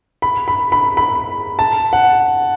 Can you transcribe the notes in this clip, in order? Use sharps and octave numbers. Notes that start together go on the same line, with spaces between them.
B5
B5
B5
B5
A5
F#5